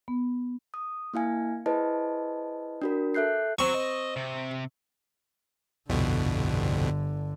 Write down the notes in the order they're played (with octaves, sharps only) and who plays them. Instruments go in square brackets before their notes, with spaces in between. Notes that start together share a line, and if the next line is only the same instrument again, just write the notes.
[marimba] B3
[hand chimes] D#6
A#3 E4 F5 G#5
E4 G#4 B4 C5 D#5 A5
D4 F#4 A#4
A4 E5 F#6 G6 C7
[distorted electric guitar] F#3 [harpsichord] C4 C#6
[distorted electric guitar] D#5
C3
[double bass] G1 D3 [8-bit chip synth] C2 F2 B2